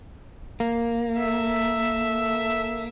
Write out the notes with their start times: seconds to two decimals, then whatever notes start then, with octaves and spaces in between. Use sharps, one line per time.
0.60 A#3
1.16 A4 E5